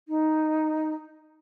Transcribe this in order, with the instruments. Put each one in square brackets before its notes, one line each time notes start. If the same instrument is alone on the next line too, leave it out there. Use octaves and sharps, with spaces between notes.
[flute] D#4